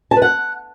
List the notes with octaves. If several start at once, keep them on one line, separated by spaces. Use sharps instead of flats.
A5
B4
F#5